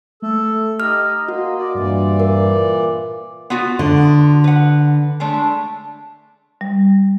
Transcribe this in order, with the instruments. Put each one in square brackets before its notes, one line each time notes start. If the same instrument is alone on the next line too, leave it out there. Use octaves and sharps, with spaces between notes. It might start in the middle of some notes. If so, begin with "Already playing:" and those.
[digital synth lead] A3 [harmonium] A4
[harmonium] D#4 G4 [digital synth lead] D#5 [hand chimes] F6
[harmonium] A#3 [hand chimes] F#4
[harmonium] D5
[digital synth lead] G2 [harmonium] A#2 E3 D5
[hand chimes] A#4
[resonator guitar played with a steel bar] B3 F4 F#4
[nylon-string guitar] D3
[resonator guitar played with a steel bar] B4 F#5
G#3 A3 D4
[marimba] G3